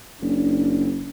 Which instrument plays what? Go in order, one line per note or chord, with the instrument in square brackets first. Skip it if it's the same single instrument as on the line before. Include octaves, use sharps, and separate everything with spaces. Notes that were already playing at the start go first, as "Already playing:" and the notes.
[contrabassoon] F#1 [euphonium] D4